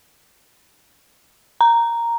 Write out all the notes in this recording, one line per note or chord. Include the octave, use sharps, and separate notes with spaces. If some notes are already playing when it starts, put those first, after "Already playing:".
A#5